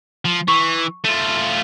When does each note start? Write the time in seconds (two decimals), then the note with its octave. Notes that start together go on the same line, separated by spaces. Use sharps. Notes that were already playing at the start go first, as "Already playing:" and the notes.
0.25 F3
0.48 E3 C#6
1.04 A3 F4 D#7